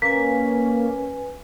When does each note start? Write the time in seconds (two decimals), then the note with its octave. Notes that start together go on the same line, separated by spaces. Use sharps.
0.02 A#3 C#4 B4 G#5 B6